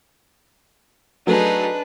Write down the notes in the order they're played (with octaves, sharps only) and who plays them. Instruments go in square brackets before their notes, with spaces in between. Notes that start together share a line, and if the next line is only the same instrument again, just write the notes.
[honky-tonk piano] F#3 A3 [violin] D4 B4 [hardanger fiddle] D#4 G#4